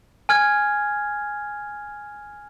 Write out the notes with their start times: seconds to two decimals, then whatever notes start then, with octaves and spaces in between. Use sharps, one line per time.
0.29 G#5 F6 G#6